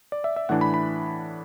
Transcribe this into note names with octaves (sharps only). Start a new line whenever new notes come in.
D5
E5
E5
A2 E3 D4 F#5
B5
B5